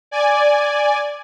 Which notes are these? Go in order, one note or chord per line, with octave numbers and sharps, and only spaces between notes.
D5 G#5